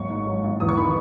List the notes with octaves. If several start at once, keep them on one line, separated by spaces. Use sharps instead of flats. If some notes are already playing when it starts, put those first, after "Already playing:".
Already playing: G#1 F#3 C#6
G#2
F#3
G#1
E2 D#6
C#6
D#3 B5